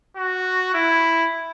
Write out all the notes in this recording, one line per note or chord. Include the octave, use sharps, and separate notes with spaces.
F#4
E4